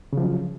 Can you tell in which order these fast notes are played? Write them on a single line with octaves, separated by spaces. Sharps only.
C#3 F3 F#3